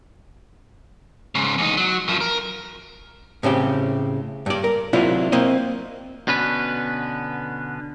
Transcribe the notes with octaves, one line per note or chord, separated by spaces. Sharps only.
G#2 C#3
E2 D#4
F#3
F#2 F3
A#4
A2 C#3 C4 G4
G2 D5
A#4
C3 F#3 D4 E4 F4
A#3 C4 D#5
B2 D3 B3 C#4 B4